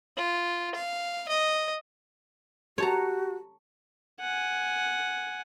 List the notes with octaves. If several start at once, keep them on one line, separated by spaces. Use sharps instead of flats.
F4
F5
D#5
F#4 G4 C#5 A5 A#5
F#5 G#5